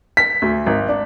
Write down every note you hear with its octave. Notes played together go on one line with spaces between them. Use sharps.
B6
D2
G#1
D4